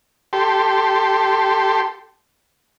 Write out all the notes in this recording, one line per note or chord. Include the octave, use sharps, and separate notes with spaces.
G4 A4 C6